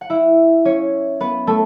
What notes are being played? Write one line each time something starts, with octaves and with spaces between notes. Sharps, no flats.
F#5
E4 E5
C#4 C#5
B3 B4
A3 A4